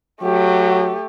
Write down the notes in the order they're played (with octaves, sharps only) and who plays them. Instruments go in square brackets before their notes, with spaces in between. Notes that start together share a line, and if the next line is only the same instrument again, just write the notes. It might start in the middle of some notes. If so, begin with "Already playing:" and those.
[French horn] F#3 [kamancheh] A3 G4